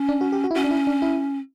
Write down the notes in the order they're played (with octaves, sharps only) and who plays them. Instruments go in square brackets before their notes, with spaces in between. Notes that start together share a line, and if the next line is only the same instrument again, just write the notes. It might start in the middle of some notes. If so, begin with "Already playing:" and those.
Already playing: [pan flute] C#4
[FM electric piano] D4
F#4
G4
F#4
E4
[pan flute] C#4 [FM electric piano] F#4
[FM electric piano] D4
E4
D4
E4